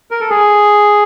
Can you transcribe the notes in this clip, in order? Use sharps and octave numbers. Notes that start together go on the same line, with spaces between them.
A#4
A4
G#4